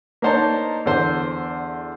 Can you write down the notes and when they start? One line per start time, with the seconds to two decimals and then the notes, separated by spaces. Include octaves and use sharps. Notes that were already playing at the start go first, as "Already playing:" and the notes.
0.22 A#3 D4 D#4 C5 C#5 A5
0.86 E2 D3 C5 E6